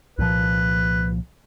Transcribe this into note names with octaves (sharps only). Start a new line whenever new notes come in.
C2 A#2 F3 B4